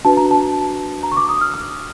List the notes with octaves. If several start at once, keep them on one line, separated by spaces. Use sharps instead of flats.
D4 F#4 B4 A5
A#5
A5
A#5
C#6
D6
D#6
F6
F6